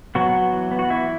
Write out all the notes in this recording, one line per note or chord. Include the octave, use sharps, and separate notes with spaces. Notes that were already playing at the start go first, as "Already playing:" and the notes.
F#3 B3 F#4
B3
E3
B3
F#4
E3 E4